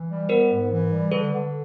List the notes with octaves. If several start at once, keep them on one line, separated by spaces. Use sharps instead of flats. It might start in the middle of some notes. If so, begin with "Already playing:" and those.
Already playing: E3
G3
B3 A#4 C5
G#2
E3
G3
D3 A4 B4
D3